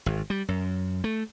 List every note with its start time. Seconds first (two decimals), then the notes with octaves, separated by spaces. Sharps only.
0.06 G#1
0.30 G3
0.48 F#2
1.04 A3